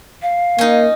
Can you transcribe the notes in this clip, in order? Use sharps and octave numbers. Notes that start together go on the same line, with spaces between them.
F5
A#3 C#4 D#4